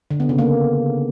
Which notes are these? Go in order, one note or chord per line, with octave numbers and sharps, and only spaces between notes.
D3
B3
C#3
A#3